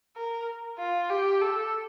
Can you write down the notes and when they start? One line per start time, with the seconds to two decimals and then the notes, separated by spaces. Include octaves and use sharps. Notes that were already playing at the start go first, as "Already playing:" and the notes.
0.16 A#4
0.79 F4
1.10 G4
1.41 A4